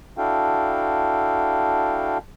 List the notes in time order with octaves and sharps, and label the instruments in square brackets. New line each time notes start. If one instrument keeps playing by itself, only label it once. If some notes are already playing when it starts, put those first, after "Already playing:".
[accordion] D4 E4 F#4 A4 F5 G5